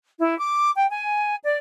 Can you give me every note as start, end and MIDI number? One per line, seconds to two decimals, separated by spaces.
0.19 0.37 64
0.38 0.71 86
0.76 0.88 79
0.89 1.35 80
1.43 1.56 74